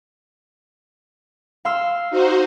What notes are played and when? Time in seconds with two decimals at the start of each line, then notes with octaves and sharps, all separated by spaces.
1.65 F5 C6 E6
2.10 D#4 F#4 C5